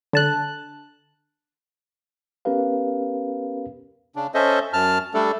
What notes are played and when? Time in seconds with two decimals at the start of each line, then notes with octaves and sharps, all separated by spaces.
0.13 D3 A5 F#6
2.45 B3 C#4 G4 A#4 B4 F5
4.16 C#3 D4
4.34 C#4 A4 C5 D#5 E5
4.73 F#2 A5 F6
5.14 G3 A3 D4 A4